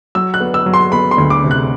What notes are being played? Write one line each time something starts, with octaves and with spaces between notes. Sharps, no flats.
F#3 E6
F#6
B3
E6
F#3
C6
B3 B5
C6
D2
D6
C3
F#6